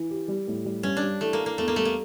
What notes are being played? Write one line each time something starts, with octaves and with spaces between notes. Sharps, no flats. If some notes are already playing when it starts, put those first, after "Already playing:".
Already playing: E3
G4
G3
A2
G3
G2 C#4
D4
G3
E3 A3
A#3
E3
A#3
E2 A3
A#3
G3 A3
A#3